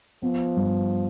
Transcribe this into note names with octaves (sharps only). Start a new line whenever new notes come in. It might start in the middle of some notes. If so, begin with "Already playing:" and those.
F3 B3
G2